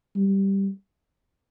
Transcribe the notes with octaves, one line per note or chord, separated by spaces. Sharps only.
G3